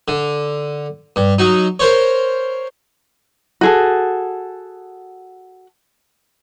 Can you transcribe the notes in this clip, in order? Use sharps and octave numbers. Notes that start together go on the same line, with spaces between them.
D3
G2
F#3 D#4
A#4 C5 C#5
F#4 G#4 A4